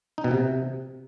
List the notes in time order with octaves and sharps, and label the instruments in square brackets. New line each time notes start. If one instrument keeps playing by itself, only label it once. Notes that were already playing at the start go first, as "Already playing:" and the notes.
[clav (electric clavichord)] D#4
B2
C3